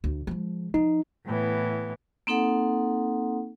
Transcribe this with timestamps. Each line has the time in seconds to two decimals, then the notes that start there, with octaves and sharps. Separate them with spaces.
0.04 D2
0.27 F3 G#3
0.74 F3 D#4
1.25 A2 E3 B3
2.27 A#3 C4 D#4 A4 F#5